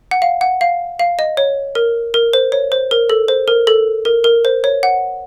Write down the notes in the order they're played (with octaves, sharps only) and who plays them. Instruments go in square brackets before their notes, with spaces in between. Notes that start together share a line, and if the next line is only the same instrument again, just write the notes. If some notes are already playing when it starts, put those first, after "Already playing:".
[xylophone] F#5
F5
F#5
F5
F5
D#5
C#5
A#4
A#4
C5
C#5
C5
A#4
A4
C5
A#4
A4
A#4
A#4
C5
C#5
F#5